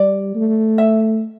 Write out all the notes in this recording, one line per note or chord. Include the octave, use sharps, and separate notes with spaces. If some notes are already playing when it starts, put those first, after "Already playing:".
Already playing: G3 D5
A3
E5